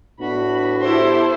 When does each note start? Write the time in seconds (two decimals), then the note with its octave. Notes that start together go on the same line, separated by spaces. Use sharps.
0.21 A2 B3 D4 F#4 B5
0.81 E4 G4 A4 C5